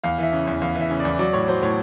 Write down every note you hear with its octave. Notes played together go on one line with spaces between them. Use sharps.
E2 F5
E3 E5
C#3
E2
E2 F5
E3
E5
C#3
E2 D5
F#3 D5
A2 C#5
F#3 C5
A2 C#5